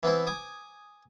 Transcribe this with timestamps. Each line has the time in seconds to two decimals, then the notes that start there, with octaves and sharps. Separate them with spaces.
0.03 E3 B3 C4 E4
0.27 G#5 D6 D#6